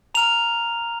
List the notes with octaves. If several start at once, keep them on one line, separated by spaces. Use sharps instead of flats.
A#5 F6 F7